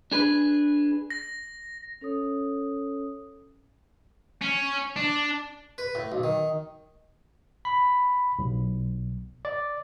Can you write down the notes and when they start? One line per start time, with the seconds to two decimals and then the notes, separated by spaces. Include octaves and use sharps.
0.11 D4 G#4 B4
1.10 A#6
2.01 C#4 A4 C#5 D#6
4.42 C#4
4.96 D4
5.78 B4
5.95 A2
6.12 B1
6.23 D#3
7.65 B5
8.39 B1
9.45 D5